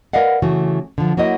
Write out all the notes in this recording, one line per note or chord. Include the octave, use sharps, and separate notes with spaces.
A#4 B4 D5 D#5 F5 F#5
C#3 E3 A3 F#4
D3 F3
F#3 A#3 E4 F#4 D#5